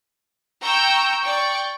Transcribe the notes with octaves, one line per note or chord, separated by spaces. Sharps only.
G5 A#5 C#6 E6 G6
D5 G5 C#6